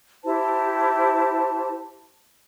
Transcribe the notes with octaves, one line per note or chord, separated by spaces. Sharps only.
E4 G4 C5 A5